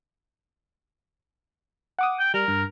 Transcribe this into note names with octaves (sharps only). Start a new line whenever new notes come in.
F#5 D6 D#6
G5
G3 A#4
G2